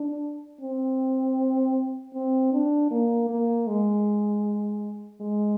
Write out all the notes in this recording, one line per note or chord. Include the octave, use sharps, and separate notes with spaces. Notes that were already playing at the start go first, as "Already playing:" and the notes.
Already playing: D4
C4
C4
D4
A#3
A#3
G#3
G#3